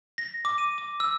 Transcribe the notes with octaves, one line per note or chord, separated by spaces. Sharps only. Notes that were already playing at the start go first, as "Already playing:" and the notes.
A#6
D6
D#7
D6
E6